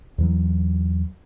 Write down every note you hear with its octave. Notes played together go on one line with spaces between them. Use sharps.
E2 E3 F#3